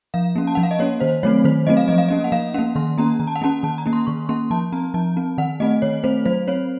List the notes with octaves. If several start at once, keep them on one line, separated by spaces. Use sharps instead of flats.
F3 F5
A#3 C#4
A5
F3 F#5
F5
D#5
A#3 C#4 C#5
D#3 C5
F#3 A3 C4 C#5
D#3 C5
F#3 A3 C4 D#5
F5
F3 D#5
F5
A#3 C#4 D#5
F#5
F3 F5
A#3 C#4 F#5
D#3 C6
A#3 C#4 A#5
D#3 A#5
A5
F#5
A#3 C#4 A5
D#3 A5
A#5
A#3 C#4
C6
D#3 C#6
A#3 C#4 C6
F3 A5
C4 A#5
F3 A5
C4
D#3 F#5
A3 C4 D#5
D#3 C#5
A3 C4 C5
F#3 C5
C4 C#5